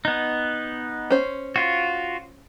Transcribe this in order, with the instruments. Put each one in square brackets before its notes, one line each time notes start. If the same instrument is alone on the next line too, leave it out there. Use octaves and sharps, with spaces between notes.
[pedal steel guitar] B3 D#4
[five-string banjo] C#4 C5
[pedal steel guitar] F4 F#4